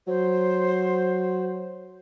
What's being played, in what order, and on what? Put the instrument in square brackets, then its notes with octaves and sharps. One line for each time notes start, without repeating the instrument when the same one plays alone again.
[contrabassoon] F#3 [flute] C5